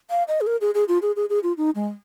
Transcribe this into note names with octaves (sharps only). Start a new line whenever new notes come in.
F5
D#5
G#4
A#4
G#4
G#4
F4
G#4
G#4
G#4
F4
D#4
G#3